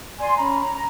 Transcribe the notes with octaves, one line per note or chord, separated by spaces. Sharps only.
D5 G#5 C6
C#4 A#5 B5
A#5
A#5